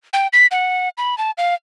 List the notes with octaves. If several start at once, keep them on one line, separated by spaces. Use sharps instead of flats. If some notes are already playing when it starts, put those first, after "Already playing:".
G5
B6
F#5
B5
A5
F5